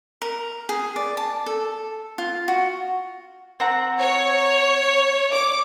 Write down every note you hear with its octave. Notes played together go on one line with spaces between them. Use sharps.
A#4
G#4
D5
A5
A4
F4
F#4
C4 F#5 A#5
C#5
D5 D6